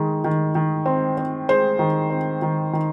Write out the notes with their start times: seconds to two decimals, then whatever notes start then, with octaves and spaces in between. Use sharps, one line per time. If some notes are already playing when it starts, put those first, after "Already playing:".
Already playing: D#3 G#3
0.24 D#3
0.55 D#3
0.86 C4
1.18 C4
1.48 G#3 C5
1.79 D#3
2.10 C4
2.42 D#3
2.73 D#3